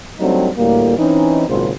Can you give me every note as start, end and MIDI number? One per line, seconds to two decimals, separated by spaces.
0.19 0.49 54
0.19 0.49 55
0.19 0.49 57
0.19 0.49 60
0.19 0.49 62
0.19 0.49 63
0.57 0.98 38
0.57 0.98 45
0.57 0.98 55
0.57 0.98 58
0.98 1.47 52
0.98 1.47 60
0.98 1.47 61
0.98 1.47 63
1.48 1.70 32
1.48 1.70 37
1.48 1.70 46
1.48 1.70 49
1.48 1.70 54
1.48 1.70 72